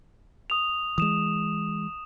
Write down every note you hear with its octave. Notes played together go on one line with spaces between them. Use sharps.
D#6 F7
E3 G#3 D#6 E7